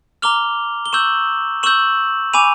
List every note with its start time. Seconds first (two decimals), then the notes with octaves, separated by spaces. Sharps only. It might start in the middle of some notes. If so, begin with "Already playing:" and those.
0.22 A#5 D6 F6 F7 G7
0.86 G7
0.93 C#6 E6 G6 E7 F#7
1.63 C#6 E6 G6 E7 F#7
2.33 G#5 B5 D6 D#7 F7